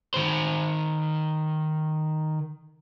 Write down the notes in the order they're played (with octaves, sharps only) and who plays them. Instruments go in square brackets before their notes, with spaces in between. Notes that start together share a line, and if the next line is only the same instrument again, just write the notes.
[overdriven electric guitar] D#3 C5